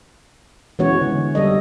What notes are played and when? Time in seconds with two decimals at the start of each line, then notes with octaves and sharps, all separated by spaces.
0.79 E3 G#3 B3 C#4 F#4 C#5
1.02 D3
1.35 G3 A4 D#5